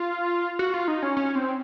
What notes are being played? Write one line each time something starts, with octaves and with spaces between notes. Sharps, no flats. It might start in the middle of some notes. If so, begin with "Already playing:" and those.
Already playing: F4
F#4
F4
D#4
C#4
C#4
C4